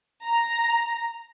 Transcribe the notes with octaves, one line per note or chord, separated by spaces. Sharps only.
A#5